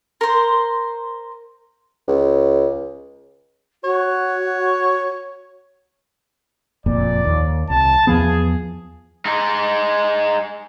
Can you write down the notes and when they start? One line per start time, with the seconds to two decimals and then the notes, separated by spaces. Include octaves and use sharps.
0.21 A#4 C5
2.08 C#2
3.84 F#4 C#5
6.86 F#1 F2 A#2 D5
7.25 D#2
7.70 C2 A5
8.07 E2 F3 B3 G#4
9.25 G#3 D#4